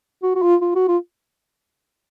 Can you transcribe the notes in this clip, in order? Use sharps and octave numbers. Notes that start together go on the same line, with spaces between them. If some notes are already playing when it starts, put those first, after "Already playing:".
F#4
F#4
F4
F4
F#4
F4